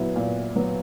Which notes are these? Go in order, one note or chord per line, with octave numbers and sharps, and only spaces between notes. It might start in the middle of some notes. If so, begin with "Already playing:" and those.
Already playing: A#2 F#3 B3 E4 F#4
A#2
F#3 B3